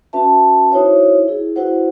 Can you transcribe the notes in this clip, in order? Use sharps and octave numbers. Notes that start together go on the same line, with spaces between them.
C#4 F#4 B4 E5 A5
D#4 E4 F#4 C5 C#5 E5
E4 G#4
E4 F#4 B4 C5 F#5